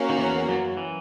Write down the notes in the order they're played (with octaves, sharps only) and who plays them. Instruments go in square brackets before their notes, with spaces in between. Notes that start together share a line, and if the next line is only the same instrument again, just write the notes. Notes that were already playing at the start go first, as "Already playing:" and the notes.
Already playing: [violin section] A#3 C#4 F#4
[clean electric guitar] D#3
E2 E3
F#2 F#3
E3